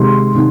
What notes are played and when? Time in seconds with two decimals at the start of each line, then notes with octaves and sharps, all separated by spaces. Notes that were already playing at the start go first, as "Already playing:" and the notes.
Already playing: C3 D#3 G#3 C6
0.34 C3 D#3